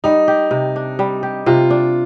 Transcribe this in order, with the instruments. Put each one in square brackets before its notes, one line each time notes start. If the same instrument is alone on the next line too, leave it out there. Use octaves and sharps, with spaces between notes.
[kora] G3 [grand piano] D#4
[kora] G4
C3
D4
G3
G4
[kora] C3 [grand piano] F4
[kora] D4